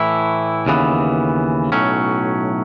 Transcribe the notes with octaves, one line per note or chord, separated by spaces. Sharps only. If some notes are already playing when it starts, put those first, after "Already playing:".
Already playing: A2 E3 A3 E4
D#2 C#3 E3 B3
B1 A2 F#3 C#4